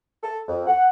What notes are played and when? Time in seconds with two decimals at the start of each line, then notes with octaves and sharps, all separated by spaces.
0.24 A4
0.48 F2
0.67 F#5